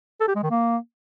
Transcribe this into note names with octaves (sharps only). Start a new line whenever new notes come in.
A4
G4
G#3
D#3
A#3